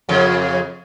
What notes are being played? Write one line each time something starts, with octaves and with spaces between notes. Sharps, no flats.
F2 C#3